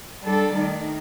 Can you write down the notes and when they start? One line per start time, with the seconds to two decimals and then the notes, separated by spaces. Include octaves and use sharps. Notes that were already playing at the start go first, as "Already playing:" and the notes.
0.22 G3 D4 A4 D5
0.55 D#3 A3 D#4